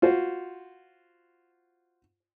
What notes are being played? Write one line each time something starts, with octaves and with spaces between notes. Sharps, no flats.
F4 F#4 C5